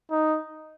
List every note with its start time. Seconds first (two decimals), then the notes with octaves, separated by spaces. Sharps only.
0.11 D#4